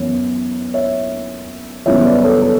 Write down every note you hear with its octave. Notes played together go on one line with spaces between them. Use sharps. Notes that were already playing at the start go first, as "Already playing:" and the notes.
Already playing: F#2 E3 B3 C#5
C#5 E5
F#2 C#3 E3 G3 B3 C#5 E5
B4 D5
A4 C#5
A4 C#5